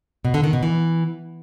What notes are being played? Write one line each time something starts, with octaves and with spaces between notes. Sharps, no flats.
B2
D3
D#3
B2
E3